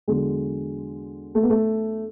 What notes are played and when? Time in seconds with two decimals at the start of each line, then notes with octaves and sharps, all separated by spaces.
0.08 E2 D3 F#3 G#3
1.35 A3
1.43 B3
1.50 A3